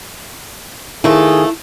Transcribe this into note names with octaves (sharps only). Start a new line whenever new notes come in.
D#3 F3 A3 E4 G#4